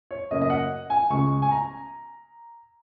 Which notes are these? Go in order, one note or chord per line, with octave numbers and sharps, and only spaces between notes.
C#5
F#2 C#3 A#3 D#5
D#5
F#5
G#5
C#2 C#3 G#3 C#6
G#5
A#5